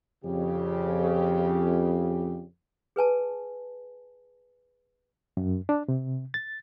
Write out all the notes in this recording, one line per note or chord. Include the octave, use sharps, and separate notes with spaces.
F2 C#3 G4
G#4 B4 G#5 A5
F#2
D4
C3
A6